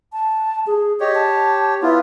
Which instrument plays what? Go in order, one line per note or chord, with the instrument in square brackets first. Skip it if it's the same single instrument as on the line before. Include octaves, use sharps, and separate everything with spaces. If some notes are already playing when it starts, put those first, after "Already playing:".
[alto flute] A5
G#4
[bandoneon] G4 C#5 [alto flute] D#5
[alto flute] A5
[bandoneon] B3 F4 [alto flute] E4